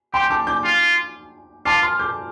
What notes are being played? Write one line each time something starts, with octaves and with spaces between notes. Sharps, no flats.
G4 G5 C6
A5 D6
D6 G6
F4
F4 A5 D6
C6 F6
D6 G6